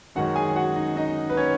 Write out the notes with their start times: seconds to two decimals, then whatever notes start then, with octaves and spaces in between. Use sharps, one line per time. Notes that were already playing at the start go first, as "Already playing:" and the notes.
0.15 F#2 D#3 G#3 C#4 F#4 F#5
0.36 G#4 G#5
0.56 F#4 F#5
0.76 D#4 D#5
0.96 D#4 D#5
1.30 B4
1.37 C#4 C#5